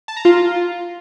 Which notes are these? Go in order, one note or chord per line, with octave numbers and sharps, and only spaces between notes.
A5
A#5
F4